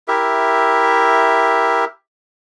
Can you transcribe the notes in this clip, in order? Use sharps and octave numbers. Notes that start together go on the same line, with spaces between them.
E4 G4 A#4 E5